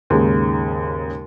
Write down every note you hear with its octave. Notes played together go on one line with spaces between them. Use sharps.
D#2 G#2 C#3